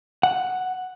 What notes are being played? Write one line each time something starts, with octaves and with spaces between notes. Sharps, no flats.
F#5